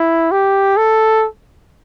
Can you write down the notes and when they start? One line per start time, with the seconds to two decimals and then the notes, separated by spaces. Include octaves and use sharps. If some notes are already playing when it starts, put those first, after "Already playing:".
Already playing: E4
0.31 G4
0.77 A4